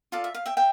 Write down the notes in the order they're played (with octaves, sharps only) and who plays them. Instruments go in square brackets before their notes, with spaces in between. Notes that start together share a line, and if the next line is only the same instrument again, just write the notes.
[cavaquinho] F4 A4 D5 F5
E5
F5
E5 G5
E5 G5